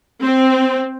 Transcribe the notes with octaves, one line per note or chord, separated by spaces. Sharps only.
C4